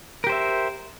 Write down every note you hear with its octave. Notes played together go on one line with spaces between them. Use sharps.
G4 A#4 C5 E5